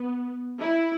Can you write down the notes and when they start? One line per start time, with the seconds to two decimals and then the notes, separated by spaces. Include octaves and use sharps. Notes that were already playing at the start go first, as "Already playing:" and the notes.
Already playing: B3
0.60 E4